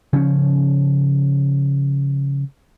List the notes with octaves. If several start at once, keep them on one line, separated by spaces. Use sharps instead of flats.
C#3 F3 C#4